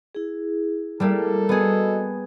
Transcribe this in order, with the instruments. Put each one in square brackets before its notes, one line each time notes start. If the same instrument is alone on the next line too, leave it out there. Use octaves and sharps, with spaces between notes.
[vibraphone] E4 G#4
[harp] G3 A3 A#3 [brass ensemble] A4
[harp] B3 G#4 [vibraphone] F#4 D#5